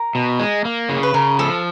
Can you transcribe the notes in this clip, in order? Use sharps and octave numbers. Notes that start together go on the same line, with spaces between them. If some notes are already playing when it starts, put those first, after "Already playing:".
Already playing: A#4
B2
G#3
A#3
C#3
B4
C#3 A#4
F3 A4